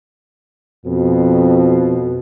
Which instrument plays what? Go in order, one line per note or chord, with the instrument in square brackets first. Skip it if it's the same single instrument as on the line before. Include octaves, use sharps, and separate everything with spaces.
[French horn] F2 [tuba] B2